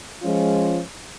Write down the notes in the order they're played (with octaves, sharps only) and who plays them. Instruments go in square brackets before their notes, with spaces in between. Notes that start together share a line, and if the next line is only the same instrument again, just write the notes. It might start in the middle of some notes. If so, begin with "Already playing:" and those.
[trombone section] F3 G#3 C#4 F4